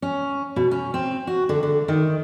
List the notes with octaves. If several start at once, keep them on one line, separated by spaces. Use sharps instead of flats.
C#4
B2
C#4
C4
F#4
D3
D3
D#3